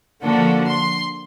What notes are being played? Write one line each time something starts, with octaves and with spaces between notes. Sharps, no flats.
D3 F3 A#3 D4 F#4 A4
C6